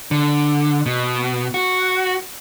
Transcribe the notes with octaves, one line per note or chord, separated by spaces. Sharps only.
D3
B2
F#4